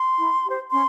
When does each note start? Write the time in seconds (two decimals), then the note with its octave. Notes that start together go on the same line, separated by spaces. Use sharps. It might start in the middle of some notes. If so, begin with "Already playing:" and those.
Already playing: C6
0.19 E4
0.45 G4 C5
0.71 C#4 C6